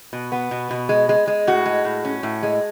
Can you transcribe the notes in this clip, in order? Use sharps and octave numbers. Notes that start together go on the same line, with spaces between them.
B2
B3
B2
B2
G#3
G#3
G#3
A2 F#4
G#3
A2
C#4
A2
G#3